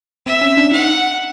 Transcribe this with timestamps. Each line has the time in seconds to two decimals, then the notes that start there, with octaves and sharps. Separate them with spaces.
0.26 C4 E5
0.41 C#4
0.57 D4
0.72 D#4 F#5